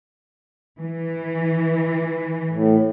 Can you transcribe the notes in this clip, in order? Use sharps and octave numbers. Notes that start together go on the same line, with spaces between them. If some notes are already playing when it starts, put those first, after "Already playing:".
E3
A2